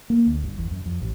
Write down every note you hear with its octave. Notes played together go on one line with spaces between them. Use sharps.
A#3
D2
G1
E2
F#2
F2
A1